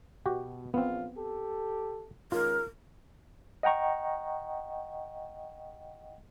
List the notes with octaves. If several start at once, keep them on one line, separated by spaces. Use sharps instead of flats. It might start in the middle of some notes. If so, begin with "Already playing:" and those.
B2 F#4 G4
A#1 E2 B3 C4 F4
G4 A4
D#3 G#3 C#4 F4 A#4
D#5 F#5 G5 A#5 C#6